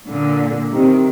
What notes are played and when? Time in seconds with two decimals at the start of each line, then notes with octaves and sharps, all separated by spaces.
0.09 A#2 D3
0.72 C3 D#3